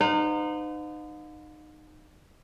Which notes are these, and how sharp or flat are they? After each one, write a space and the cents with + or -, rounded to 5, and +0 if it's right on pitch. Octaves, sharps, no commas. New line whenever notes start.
D#4 -25 C5 -45 F5 +45